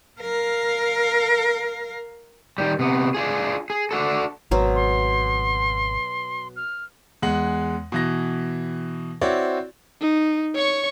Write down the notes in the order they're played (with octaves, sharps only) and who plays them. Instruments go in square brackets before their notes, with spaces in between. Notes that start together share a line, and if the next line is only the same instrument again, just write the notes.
[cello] A#4 F5
[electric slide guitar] D#3 G3
C3 B3
D4 F4 G#4
G#4
D4 F#4 A4
[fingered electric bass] G#1 [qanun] B2 F#3 C5
[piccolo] C6
F6
[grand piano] E2 G#3 F#5 F#7
B2 E3 A#6
C4 E4 F#4 C#5 D5
[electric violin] D#4
C#5 C#6